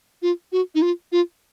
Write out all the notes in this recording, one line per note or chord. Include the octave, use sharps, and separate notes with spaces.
F4
F#4
D#4
F4
F4